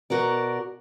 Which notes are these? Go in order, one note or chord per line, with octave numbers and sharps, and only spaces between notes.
B2 F#4 A#4 D5